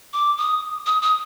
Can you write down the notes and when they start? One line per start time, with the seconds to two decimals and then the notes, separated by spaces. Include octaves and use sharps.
0.13 D6
0.37 D#6
0.86 D#6
1.02 D#6